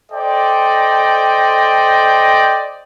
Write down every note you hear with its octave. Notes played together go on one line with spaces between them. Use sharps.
A4 C5 D5 D#5 G5